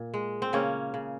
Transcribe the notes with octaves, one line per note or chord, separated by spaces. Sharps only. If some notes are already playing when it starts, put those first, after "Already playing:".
Already playing: A#2
G#3
C4
C#3 A#3 C#4
C#3